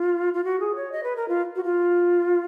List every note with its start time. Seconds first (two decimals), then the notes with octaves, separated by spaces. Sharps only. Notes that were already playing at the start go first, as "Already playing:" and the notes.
Already playing: F4
0.34 F4
0.44 F#4
0.60 G#4
0.76 C#5
0.92 D#5
1.04 B4
1.16 A#4
1.29 F4
1.56 F#4
1.64 F4